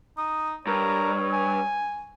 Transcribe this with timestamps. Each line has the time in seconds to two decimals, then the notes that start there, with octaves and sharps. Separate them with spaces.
0.18 D#4 D#6
0.67 G2 A#4 C#5
1.33 G#5